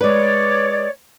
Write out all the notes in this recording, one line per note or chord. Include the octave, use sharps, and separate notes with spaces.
G#3 B4 C#5 D5